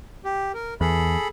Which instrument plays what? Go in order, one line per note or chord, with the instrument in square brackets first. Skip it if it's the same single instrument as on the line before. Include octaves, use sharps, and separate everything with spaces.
[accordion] G4
A#4
[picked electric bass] E2 [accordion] G#4 A4 B5